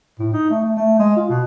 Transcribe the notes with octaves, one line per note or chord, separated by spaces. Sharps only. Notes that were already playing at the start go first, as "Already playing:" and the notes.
A2
D#4
A3
A3
A3
G#3
F4
B2